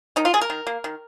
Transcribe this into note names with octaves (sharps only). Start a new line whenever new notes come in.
D#3 D#4
F4
A#3 G#4
A#4
D#3
A#3
D#3